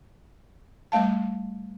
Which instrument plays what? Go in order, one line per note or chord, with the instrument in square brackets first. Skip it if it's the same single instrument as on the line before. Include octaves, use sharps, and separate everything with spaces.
[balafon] G3 A3 F5 A5